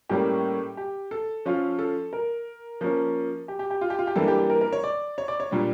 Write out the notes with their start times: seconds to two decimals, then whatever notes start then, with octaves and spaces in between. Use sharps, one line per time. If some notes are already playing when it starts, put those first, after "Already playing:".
0.09 A2 G3 A#3 C#4 G4
0.77 G4
1.11 A4
1.45 F3 C#4 F4
1.79 A4
2.13 A#4
2.81 F3 A#3 C#4
3.48 G4
3.59 G4
3.70 G4
3.81 F4
3.90 G4
3.99 F4
4.07 G4
4.16 E3 G3 A#3 D4 A4
4.28 G4
4.38 G4
4.50 A#4
4.61 A#4
4.73 C#5
4.84 D5
5.18 C#5
5.28 D5
5.40 C#5
5.51 A#2 G3 D4